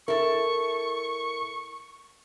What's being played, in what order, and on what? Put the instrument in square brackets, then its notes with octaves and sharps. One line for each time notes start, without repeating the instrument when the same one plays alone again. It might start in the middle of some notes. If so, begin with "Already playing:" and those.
[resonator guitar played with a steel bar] E4 A4 [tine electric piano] A#4 [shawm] C#6